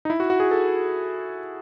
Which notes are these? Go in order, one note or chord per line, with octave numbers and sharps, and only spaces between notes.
D#4
E4
F#4
F#4
G#4
A4